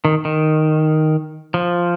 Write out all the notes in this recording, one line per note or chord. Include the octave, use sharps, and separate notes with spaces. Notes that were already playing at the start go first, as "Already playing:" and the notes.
D#3
D#3
F3